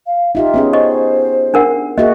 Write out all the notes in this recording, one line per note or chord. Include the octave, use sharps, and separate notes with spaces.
F5
D#4 F4 G4 E5
B3 C#4 G#4
C5 D#5 C#6
D4 A#4 F#5
A#3 F#4 G#4 D#5 E5